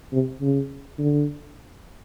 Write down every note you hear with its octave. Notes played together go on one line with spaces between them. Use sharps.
C3
C#3
D3